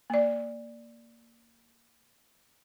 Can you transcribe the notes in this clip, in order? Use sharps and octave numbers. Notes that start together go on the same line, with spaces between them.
A#3 D5